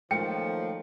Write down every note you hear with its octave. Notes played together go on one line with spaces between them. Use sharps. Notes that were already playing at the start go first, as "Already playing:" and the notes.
F#2 D#3 F3 A3 A#3 G5 C#7